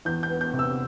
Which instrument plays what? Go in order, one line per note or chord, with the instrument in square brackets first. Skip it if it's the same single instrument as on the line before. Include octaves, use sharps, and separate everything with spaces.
[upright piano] E2 G6
G6
B3
G6
C3
E6